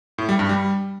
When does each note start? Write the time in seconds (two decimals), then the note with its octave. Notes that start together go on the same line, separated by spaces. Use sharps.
0.18 A2
0.29 G3
0.39 G2
0.49 G3